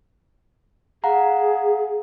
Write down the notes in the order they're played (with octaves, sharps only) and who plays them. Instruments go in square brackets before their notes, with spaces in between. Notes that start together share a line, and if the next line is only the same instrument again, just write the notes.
[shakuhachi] G#4 [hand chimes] F5 F#5 A#5